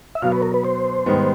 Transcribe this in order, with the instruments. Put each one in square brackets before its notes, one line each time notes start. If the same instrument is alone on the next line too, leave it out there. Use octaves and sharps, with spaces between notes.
[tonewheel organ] E5
[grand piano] B2 F#3 B3 [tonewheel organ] F5
[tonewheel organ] B4
A#4
B4
C5
[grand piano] G#2 D#3 G3 B3